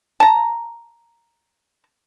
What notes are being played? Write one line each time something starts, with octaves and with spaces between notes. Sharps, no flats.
A5 A#5